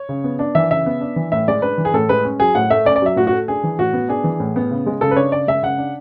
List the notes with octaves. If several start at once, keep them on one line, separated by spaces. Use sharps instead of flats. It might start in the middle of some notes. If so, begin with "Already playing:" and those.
Already playing: C#5
C#3
B3
D4
E3 E5
C#3 E5
B3
D4
E3
A2 E5
G#3 D5
D4 B4
E3
G#4
A2 A4
G#3 B4
C#4
F#3 G#4
A2 F#5
A3 E5
C#4 D5
D5
F#3 E5
A2 F#4
F#4
A3
D4 G#4
E3
A2 F#4
B3
D4 G#4
E3
A2
B3
C#3
G#3
C#3 A4
B4
D4 C#5
C#3 D5
G#3 E5
C#3 F#5
D4